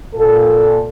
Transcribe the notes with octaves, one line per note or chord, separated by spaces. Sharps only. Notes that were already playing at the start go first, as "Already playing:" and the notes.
A#2 A4